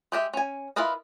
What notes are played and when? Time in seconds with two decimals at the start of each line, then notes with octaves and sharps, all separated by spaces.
0.12 G#3 G4 A#4 E5
0.34 C#4 G#5
0.76 E4 F4 A#4 B4 D#5